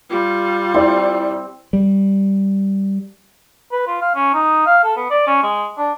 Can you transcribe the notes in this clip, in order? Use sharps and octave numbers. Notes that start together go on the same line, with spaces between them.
G3 F4
C4 E4 D5
G3
B4
F4
F5
C#4
D#4
F5
A4
B3
D5
C#4
G#3
D4